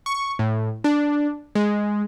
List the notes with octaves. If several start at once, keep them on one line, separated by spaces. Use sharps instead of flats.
C#6
A2
D4
G#3